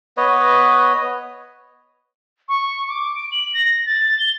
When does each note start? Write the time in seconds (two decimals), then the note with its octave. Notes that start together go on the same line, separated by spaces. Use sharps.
0.17 B3 B4 C#5 D#5
2.49 C#6
2.89 D6
3.15 D7
3.32 F#7
3.54 A#6
3.86 A6
4.19 G7